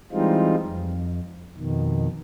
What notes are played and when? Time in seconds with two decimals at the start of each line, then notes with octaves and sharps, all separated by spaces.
0.12 E3 G3 G#3 C4 D#4 F4
0.62 F2
1.57 F2 B2 D#3